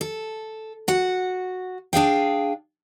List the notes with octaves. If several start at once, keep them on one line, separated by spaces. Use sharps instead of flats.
A4
F#4 F#5
D4 G#4 F5 G5